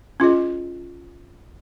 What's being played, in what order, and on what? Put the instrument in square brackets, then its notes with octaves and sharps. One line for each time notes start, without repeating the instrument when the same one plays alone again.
[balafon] C#4 F4 G#4 D#5